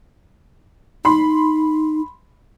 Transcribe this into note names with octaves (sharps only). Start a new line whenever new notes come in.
D#4 B5 C6